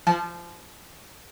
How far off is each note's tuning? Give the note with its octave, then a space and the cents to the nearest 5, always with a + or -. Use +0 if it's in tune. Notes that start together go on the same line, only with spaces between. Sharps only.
F3 -20 A5 -20